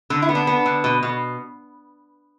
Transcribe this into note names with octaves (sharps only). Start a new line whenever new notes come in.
D3 D4
E4
B3
D4
B3
D3
B2
B2